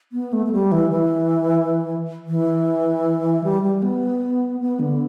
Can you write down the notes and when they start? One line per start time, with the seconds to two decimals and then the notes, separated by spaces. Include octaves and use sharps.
0.12 B3
0.33 A3
0.46 A3
0.52 G3
0.72 E3
0.91 E3
2.27 E3
3.44 G3
3.63 G3
3.82 B3
4.60 B3
4.80 D3